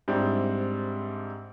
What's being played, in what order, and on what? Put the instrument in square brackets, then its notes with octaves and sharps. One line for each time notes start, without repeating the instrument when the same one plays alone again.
[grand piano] G#2 G3 C4 D4 E4